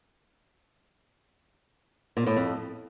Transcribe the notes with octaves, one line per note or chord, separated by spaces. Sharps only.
A#2
A2
F2